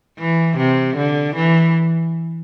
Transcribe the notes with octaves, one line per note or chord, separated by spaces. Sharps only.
E3
C3
D3
E3